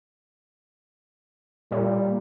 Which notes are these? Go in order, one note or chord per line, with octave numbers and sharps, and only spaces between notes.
A#2 G3